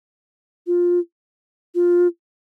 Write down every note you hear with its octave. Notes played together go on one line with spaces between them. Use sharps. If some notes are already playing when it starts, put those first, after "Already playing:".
F4
F4